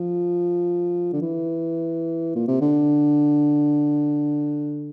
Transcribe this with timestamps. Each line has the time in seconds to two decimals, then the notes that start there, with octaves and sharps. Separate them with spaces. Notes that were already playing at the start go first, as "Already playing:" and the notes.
Already playing: F3
1.13 D3
1.22 E3
2.35 A#2
2.48 C3
2.61 D3